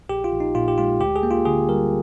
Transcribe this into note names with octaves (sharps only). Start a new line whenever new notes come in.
A#1 G4
F4
A#1
D#4
A#2 F4
G4
G#3 F4
D2 G4
G#4
A#3
F4
D3 G#4
G3 A#4